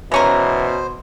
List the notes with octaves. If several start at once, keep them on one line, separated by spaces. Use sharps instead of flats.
B2 E3 G#3 C#4 A#4 C5